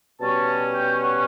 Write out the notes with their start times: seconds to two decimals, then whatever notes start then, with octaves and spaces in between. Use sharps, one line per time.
0.20 B2 G3 C#4 A5
0.74 G5
1.02 F#5